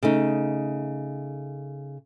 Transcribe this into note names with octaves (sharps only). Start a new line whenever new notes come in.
C#3 A3 D#4